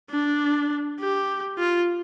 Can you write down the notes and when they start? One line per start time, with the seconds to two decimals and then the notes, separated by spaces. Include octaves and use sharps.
0.11 D4
1.00 G4
1.59 F4